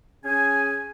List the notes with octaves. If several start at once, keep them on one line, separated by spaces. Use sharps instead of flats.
C#4 G#4 G#5